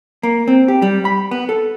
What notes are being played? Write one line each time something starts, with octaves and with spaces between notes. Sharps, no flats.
A#3
C4
G4
G3
B5
B3
A4